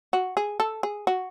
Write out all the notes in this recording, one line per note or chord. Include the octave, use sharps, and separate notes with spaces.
F#4
G#4
A4
G#4
F#4